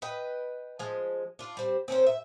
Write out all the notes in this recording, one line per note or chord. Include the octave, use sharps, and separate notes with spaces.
B4 D#5 G5
F3 G#3
D4 F4
G3 C4
C4 C#4 A#4 C5
E5